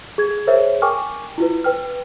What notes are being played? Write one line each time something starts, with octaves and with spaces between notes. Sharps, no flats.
G#4 G#6
G#4 A#4 C5 C#5 E5
A#4 G5 G#5 C#6 D6 F6
E4 F4 B4
B4 G5 F6